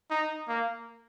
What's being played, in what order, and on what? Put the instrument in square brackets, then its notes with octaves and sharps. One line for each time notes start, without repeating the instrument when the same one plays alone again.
[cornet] D#4
A#3